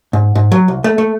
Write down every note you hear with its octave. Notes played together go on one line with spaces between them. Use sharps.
G#2
G#2
F#3
C2
A3
A3